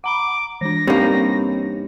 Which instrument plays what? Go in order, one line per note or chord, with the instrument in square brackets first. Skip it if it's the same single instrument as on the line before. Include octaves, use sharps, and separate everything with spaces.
[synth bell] F#5 A#5 B5 [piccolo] D6
[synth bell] E3 D4 [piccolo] A#6
[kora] G2 A#3 [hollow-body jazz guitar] C4 C#4 D#4